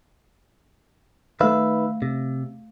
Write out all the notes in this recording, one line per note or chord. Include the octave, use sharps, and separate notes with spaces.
D#3 A3 B4 E5 F5
C3